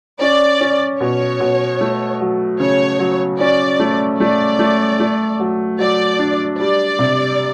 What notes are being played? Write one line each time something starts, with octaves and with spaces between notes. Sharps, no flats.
C#4 D5
C#4
B2 C#5
B2
A3
F#3
C#3 C#5
F#3
C#4 D5
A3
A3 D5
A3
A3
F#3
F#3 D5
D4
G3 D5
C3